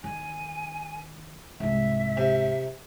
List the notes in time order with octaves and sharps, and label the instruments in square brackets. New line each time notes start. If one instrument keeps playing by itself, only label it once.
[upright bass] D#3 [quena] G#5
[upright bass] C2 G#2 [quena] E5
[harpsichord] C3